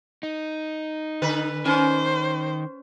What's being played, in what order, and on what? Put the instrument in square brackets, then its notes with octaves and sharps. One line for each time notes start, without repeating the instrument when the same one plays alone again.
[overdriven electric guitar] D#4
[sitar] D3 B4
[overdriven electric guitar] D#3 [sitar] C#4 [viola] C5